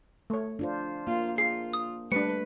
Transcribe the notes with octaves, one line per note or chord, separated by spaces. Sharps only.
A3 C#5
D4 F4 C5
A#3 F4
F4 G#4 C7
D#6
G3 A3 D4 B4 C#7